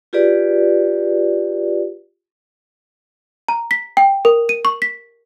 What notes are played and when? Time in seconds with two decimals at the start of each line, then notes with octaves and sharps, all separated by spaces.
0.13 F4 G4 G#4 B4 D5
3.48 A#5
3.71 B6
3.97 G5
4.25 A#4
4.49 D#7
4.65 C#6
4.82 B6